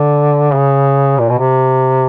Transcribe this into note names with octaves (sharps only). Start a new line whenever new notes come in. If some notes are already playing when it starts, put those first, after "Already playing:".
Already playing: D3
C#3
A#2
B2
C3